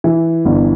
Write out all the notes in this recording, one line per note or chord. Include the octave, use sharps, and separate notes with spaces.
E3
G1